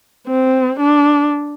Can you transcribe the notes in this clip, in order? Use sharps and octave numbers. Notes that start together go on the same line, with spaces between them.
C4
D4